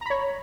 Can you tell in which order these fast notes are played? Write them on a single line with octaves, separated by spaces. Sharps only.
A#5 B5 C#5